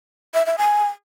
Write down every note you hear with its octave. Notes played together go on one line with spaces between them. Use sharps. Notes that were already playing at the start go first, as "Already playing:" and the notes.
E5
E5
G#5